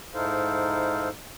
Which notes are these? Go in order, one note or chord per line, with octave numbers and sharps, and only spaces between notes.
G#2 D#4 E4 A4 C5 F5